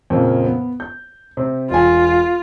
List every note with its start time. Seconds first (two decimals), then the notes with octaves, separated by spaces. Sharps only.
0.10 F2 A#2 C#3
0.44 B3
0.80 G6
1.37 C3
1.70 E1 F4 G#5